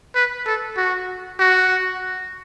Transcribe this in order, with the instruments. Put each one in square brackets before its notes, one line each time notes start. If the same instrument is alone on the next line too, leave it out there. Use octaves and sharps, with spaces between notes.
[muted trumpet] B4
A4
F#4
F#4